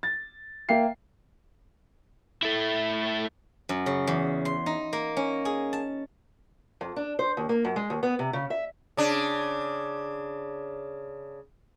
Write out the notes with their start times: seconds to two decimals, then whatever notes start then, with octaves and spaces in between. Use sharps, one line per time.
0.03 A6
0.69 A#3 E5 F5 G5 C7
2.43 A3 E4
3.69 F#2
3.86 C#3
4.07 E2
4.45 C6
4.66 D#4
4.93 A#3
5.17 C#4
5.45 G#4
5.73 A5
6.81 F2
6.96 D4
7.19 C5
7.37 D#2
7.49 A#3
7.65 F#2
7.76 G#3
7.90 D#2
8.03 B3
8.19 C3
8.33 C#3
8.50 E5
8.97 C#3 D4